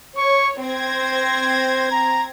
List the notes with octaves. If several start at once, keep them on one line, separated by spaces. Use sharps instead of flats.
C#5 C#6
C4 C5 G#6 A#6
A#5